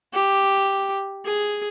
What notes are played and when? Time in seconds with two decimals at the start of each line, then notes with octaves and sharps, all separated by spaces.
0.13 G4
1.25 G#4